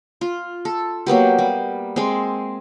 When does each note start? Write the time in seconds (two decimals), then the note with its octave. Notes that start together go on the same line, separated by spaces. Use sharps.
0.21 F4
0.65 A4
1.06 F#3 A#3 B3 G4
1.38 G3
1.96 G#3 C4